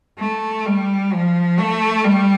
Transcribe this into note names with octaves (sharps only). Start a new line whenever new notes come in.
A3
G3
F3
A3
G3